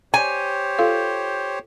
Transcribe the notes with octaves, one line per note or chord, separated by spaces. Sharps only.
G4 C5 C#5 G#5
F4 A4 F5